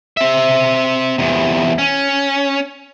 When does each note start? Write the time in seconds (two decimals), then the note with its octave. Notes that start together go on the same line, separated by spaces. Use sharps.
0.17 C4 E5
1.18 E2 C3
1.78 C#4